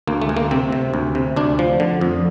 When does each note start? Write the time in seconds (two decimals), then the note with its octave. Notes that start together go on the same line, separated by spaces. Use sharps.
0.07 D2 A#3
0.22 A3
0.29 D2
0.37 A#3
0.51 C3 C4
0.72 C3
0.94 D2
1.15 C3
1.36 D2 D4
1.59 F3
1.80 D3
2.01 F2